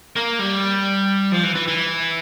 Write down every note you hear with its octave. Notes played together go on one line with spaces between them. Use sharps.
A#3
G3
F3
E3
E3
E3